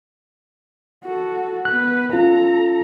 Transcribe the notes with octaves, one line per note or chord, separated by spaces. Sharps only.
F#4 A4
B3 B4 F#6
C#4 F4 A4 A#5